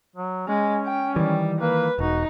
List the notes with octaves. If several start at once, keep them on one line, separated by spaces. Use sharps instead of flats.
F#3
G#3 C#4
G5
D#3 E3 G3
A#3 B4
E1 D#4 F#4